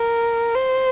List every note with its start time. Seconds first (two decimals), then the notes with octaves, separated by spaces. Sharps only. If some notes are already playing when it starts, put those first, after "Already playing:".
Already playing: A#4
0.56 C5